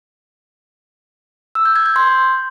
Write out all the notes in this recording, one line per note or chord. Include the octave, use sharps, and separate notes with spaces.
E6
G6
G#6
G6
C6